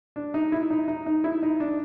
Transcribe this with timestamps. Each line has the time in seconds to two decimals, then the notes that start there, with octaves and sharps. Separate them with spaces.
0.16 D4
0.34 D#4
0.52 E4
0.70 D#4
0.88 D#4
1.06 D#4
1.24 E4
1.43 D#4
1.60 D4